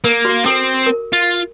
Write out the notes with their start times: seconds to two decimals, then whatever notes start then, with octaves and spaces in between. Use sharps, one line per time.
0.04 A#3 A#4
0.25 F#4
0.45 C4 A4
0.86 A#4
1.13 F4